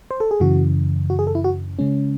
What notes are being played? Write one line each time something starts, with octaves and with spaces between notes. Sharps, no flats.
C5
A4
G#4
F#2 C#3 E3 F#4
F#4
G#4
A4
E4
F#4
C#3 G#3 C#4